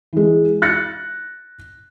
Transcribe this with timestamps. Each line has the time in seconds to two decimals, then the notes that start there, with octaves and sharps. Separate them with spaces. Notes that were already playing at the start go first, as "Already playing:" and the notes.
0.13 E3 G#3
0.62 F#6 A6 A#6 C#7